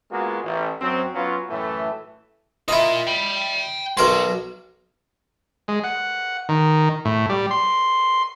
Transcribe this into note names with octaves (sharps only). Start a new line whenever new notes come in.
G#3 A#3 B3 F4 F#4
A1
F#2 F#3 C4
F#3 B3 C#4 F4
F#2 A2 E3 A3
E4 F4 A#4 D#5
G5 B5
B1 F#3 A#4 C6
G#3
F#5
D#3
A2
G3
C6